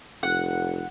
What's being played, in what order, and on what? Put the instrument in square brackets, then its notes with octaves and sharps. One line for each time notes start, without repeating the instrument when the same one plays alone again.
[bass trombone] F1 [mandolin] F#5